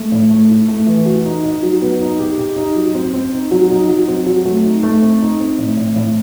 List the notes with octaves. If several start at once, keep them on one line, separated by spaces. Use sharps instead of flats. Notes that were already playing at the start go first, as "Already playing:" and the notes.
Already playing: A3
A2
A3
E4
A3
E3
F#4
D#4
D#4
F#3
B3
D#4
G4
G4
D#4
F#3
C4
C4
D#4
F#3
D#4
F#3
C4
F#3
A3
D#4
A3
C4
D#4
C4
A2
A2
A2